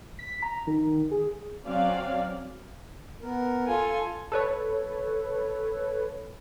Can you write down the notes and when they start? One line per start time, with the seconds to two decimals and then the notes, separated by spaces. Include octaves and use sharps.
0.19 B6
0.42 A#5
0.67 D#3
1.11 G#4
1.64 F#3 C4 C#4 D5 F5
3.22 B3 A#4
3.67 F4 A4 G#5
4.32 A4 B4 C#5